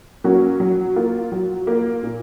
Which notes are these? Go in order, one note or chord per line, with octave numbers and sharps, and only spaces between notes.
F#3 A#3 C#4 F#4
F#3
A#3 F4
F#3
A#3 F4
A#2